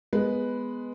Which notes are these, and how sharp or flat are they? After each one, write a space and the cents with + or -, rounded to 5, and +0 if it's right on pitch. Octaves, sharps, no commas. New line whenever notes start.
G#3 +0 B3 +0 B4 +0